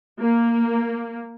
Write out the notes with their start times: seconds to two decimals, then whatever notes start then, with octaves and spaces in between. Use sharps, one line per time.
0.20 A#3